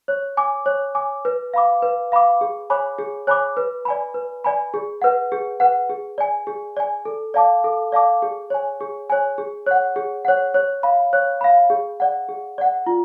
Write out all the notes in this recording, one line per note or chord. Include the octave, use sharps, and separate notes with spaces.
C#5
G#5 D6
C#5
G#5 D6
B4
F5 B5 D6
B4
F5 B5 D6
G#4
C#5 G#5 B5 D6
G#4
C#5 G#5 B5 D6
B4
D5 G#5 B5
B4
D5 G#5 B5
G#4
B4 F#5
G#4
B4 F#5
G#4
D5 G#5
G#4
D5 G#5
A4
D5 F5 A5 D6
A4
D5 F5 A5 D6
G#4
C#5 G#5
G#4
C#5 G#5
G#4
C#5 F#5
G#4
C#5 F#5
C#5
F5 B5
C#5
F5 B5
G#4
D5 F#5
G#4
D5 F#5
F4